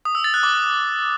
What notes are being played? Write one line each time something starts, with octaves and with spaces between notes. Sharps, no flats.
D#6
E6
A6
F#6
D6